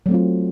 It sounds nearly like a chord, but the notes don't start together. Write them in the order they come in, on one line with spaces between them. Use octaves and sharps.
F#3 A3 C4 F4